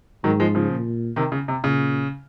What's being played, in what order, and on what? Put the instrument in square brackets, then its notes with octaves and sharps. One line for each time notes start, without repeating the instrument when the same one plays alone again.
[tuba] G#2 [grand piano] D#3 F#3
[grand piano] F3 G#3
C#3 F3
[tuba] A#2
[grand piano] C3 D#3
C#3
C3
[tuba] A#2 [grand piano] C#3